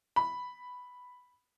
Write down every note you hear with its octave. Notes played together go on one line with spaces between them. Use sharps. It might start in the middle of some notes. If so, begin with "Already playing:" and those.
B5